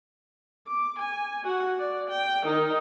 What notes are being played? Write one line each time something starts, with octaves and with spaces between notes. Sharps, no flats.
D6
G#5
F#4 F#5
D5
G5
D#3 D#4